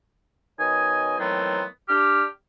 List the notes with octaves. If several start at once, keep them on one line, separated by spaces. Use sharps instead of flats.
B2 D#3 C#5 D#5 G#5
D#3 E3 F#3 A3 B3 C4
D4 G4 F6